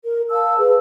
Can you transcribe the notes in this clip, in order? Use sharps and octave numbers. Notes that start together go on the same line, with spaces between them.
A#4
F5 A5 E6
G#4 B4